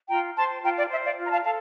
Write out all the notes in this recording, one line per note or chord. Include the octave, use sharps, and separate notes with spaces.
F4 G5 A#5
C5 A5 C6
F4 G5 A#5
D5
C5 E5
D5 F5
F4
A#5
F5 A5
A4 F5 A5